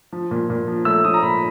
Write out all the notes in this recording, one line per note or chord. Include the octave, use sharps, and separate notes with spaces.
F3
A#2
A#2
F3
A3 E6
F3 D#6
A#5
A#2 B5